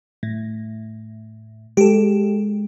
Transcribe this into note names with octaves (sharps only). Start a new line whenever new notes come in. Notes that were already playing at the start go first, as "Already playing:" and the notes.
A2
G#3 G4 A4